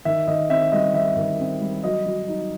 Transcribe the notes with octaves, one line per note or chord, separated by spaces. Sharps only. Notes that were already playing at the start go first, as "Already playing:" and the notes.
D#3 E5
D#3 D#5
C4 E5
G3 D#5
D#3 E5
D#3
C4
G3
F#3 D#5
F#3
D#4